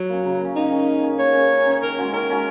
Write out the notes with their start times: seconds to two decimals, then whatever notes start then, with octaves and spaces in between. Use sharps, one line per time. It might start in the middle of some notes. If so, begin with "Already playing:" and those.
Already playing: F#3
0.09 A#3 C#4
0.25 C#3
0.41 A#3 C#4
0.56 A#3 D#4
0.71 C#4 G#4
0.87 A#3
1.03 C#4 G#4
1.19 A#3 C#5
1.35 C#4 G#4
1.51 A#3
1.66 C#4 G#4
1.82 D#3 A#4
1.98 G#3 C#4 F#4
2.13 D#3 A#4
2.29 G#3 C#4 F#4